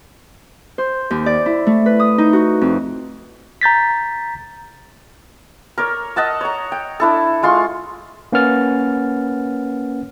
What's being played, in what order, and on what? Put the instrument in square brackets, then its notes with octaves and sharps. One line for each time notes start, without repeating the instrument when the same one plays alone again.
[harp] C5
D#2
D5
E4
A3
B4
D#6
D#4
F#4
F2
[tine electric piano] A#5 G6 A6 B6
[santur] A#4 C#5 D5
D#5 F#5 A5 E6
C#5 A#5
G5
D4 E4 A4
G#3 F4 C6 C#6
[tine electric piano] A#3 C#4 B4 F#5 F6 A6